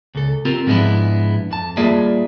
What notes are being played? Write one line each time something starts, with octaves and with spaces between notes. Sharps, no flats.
C#2 A4
C4 F4 G4 A#4
G#2 F3 G#3 B3 D4 E4
F2 A5
G3 A#3 F4 G#4 D5 E5